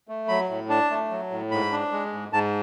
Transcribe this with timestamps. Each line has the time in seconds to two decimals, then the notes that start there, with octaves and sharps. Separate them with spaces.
0.08 A3
0.28 F#3 B5
0.49 A2
0.69 D4 A5
0.90 A3
1.11 F#3
1.31 A2
1.51 G#2 B5
1.71 D4
1.92 G#3
2.13 G#2
2.32 G#2 A5